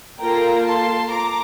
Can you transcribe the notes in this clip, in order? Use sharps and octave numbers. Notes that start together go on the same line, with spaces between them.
A#3 F4 A4 G5 A#5
A5 C6
A#5 D6